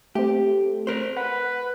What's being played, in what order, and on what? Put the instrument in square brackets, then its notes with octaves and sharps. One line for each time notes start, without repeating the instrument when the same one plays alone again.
[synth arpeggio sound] A3 C4 [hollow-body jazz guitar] G4
[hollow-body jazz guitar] A#4 C5
[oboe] B4 [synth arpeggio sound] F#5